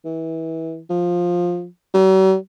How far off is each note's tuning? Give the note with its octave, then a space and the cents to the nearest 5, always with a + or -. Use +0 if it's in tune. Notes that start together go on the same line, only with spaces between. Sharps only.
E3 -25
F3 +10
F#3 +45